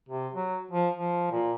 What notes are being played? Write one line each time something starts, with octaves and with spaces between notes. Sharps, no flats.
C3
F#3
F3
F3
A#2